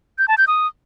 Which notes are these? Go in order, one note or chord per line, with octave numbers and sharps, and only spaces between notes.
G6
A5
G6
D#6